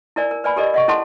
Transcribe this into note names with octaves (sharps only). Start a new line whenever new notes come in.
E4 A#4 D5 G#5
A#4
B4 D5 G#5 B5
G4 A4 A#4 D5 D#5
D#5 F#5 C#6
C#4 E4 A4 F#5 A5 C6